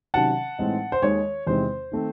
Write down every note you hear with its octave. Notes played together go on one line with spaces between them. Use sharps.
C3 D#3 F#3 C#4 F#5 A5
A2 E3 G#3 C4 D#4
C5
D#2 D#3 G#3 D#4 C#5
E2 C3 D#3 G#3 C4 C5
D#3 A3 C4